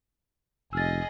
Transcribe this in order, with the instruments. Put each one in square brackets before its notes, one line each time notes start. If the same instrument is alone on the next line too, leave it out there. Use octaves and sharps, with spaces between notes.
[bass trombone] F1 [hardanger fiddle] G#4 D#5 [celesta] E6 F6 A6